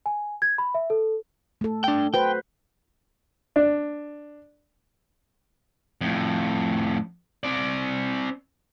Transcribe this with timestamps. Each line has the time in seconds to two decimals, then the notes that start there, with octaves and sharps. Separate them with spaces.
0.06 G#5
0.42 G#6
0.58 B5
0.74 E5
0.90 A4
1.61 A3 A4
1.84 D4 G5
2.14 F#4 B4 C5 G5
3.56 D4
6.01 F2 A2
7.44 C4 D5